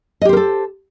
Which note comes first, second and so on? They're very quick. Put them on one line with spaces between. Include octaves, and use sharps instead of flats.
D#5 G4 C5 A#4 A4